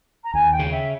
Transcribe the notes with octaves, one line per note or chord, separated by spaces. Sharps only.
A#5
D#2 G#5
G5
C#3
E5